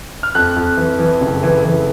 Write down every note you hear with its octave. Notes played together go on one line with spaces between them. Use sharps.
F6
F2 F#6
F2
E3
E3
F#1
E3
E3